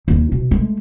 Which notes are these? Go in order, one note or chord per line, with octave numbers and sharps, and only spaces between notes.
D#2 D#4
B2
G#3 A3